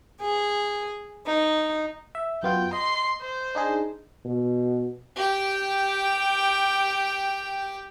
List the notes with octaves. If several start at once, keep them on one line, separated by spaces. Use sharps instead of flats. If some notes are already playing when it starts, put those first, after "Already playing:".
G#4
D#4
E5
F#2 B3 F4 G5
D#5 C6
C5
D4 D#4 G#4
B2
G4 G5